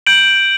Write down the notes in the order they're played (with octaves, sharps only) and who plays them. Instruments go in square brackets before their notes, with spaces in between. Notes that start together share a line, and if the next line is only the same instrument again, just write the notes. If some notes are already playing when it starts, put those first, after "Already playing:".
[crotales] G6 D7 F#7